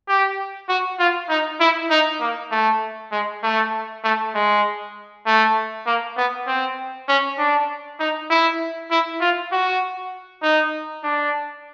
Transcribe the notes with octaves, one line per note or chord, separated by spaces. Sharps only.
G4
F#4
F4
D#4
E4
D#4
A#3
A3
G#3
A3
A3
G#3
A3
A#3
B3
C4
C#4
D4
D#4
E4
E4
F4
F#4
D#4
D4